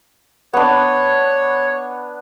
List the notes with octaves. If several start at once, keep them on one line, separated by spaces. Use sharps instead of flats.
B3 D4 C#5